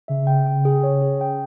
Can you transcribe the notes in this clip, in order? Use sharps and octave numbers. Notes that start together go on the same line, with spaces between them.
C#3 E5
G5
G5
G#4
C#5
G#4
G5